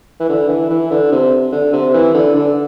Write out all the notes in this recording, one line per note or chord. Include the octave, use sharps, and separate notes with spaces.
E3
D3
E3
E3
D3
C3
D3
C3
E3
D3
D3